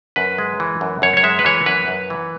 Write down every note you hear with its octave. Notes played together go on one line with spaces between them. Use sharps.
F#2 B4
G#3
E3
F#2
F#2 C#5
C#5
G#3 E5
B4
E3 C#5
F#2 B4
F#2
E3